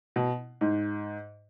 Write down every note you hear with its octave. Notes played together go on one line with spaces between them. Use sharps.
B2
G#2